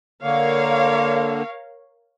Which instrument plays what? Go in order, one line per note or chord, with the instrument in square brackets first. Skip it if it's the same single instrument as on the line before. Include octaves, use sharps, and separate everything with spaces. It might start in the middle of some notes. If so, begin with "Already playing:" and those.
[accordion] D3 A#3 [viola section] A#4 C#5 F5